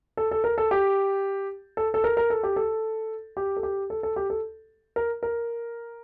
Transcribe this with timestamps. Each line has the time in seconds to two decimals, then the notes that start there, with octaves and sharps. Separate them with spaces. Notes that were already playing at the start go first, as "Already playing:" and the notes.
0.17 A4
0.31 A4
0.44 A#4
0.58 A4
0.71 G4
1.77 A4
1.94 A4
2.04 A#4
2.17 A#4
2.30 A4
2.43 G4
2.56 A4
3.37 G4
3.57 A4
3.63 G4
3.90 A4
4.03 A4
4.16 G4
4.30 A4
4.96 A#4
5.23 A#4